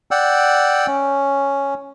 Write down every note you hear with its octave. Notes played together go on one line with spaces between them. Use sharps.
D5 F#5 G5 E6
C#4